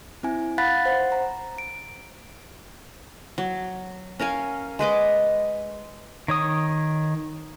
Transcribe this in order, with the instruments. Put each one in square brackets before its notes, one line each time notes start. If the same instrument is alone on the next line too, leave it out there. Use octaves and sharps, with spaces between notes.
[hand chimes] C4 E4 G#5
F5 F#5 B5 F#6 A6 B6
C5 F#5
A#5
D7
[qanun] F#3
C#4 A#4 F5 G#5
G#3 B4 D#5 D6
[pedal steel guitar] D#3 C#5 D#6